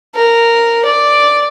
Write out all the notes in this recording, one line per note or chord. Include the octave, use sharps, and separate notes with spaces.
A#4
D5